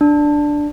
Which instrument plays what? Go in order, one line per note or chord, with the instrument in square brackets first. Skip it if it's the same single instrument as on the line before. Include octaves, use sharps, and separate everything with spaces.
[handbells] D4